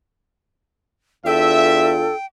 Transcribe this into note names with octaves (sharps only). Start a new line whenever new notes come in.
E2 D4 F4 A4 E5 G5